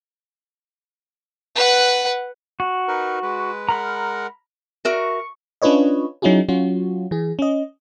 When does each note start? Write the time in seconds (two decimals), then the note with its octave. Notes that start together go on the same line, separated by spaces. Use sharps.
1.55 B4 F#5
2.60 F#4
2.88 D#4 A#4 B4
3.23 G#3 B4
3.69 G#3 A#4 F#5 A#5 B5 F6
4.85 F#4 A#4 E5 C#6
5.62 C#4 D4 F4 B4 C#5 D#5
6.22 F#3 C#4 D#4 E4 F#4 G#4
6.49 F#3 C#4 F4 F#4
7.11 E3 G#4
7.39 C#4 D#5